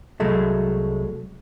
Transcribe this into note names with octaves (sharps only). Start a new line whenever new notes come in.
C2 F#3 G#3 A3